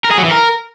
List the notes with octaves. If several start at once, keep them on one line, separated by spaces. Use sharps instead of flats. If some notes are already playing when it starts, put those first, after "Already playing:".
A#4
G#4
F#3
E3
A#4